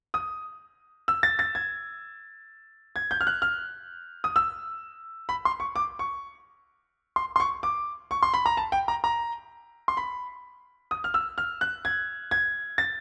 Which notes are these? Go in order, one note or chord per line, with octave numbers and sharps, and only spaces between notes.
D#6
E6
A6
A6
G#6
G#6
G6
F6
F#6
F6
D#6
E6
B5
C6
C#6
D6
C#6
C6
C6
C#6
D6
C#6
C6
B5
A#5
A5
G5
A#5
A#5
C6
B5
D#6
F6
E6
F6
F#6
G#6
G#6
A6